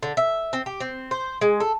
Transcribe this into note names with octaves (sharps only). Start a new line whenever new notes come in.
D3
E5
C4
G4
C4
C5
G#3
A4